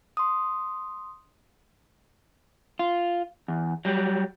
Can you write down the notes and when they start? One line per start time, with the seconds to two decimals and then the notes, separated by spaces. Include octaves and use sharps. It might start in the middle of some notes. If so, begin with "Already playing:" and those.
0.17 C6 D#6
2.79 F4
3.48 E2
3.85 F#3 G3